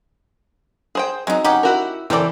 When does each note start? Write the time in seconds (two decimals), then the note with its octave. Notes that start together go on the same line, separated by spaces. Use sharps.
0.95 G#4 C5 G5
1.27 F#3 G#3 C4 D#4
1.44 C#4 D#4 G4 F#5
1.63 E4 F#4 A#4
2.10 E3 A4 A#4 C5 D5 G5